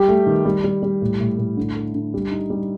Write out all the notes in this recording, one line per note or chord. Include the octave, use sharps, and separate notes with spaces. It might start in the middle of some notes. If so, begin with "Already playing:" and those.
Already playing: G3 G4
A3
D#3
G3
G3
G3
A2
A2
A2
D3
A4
D3
G3
D#4
G3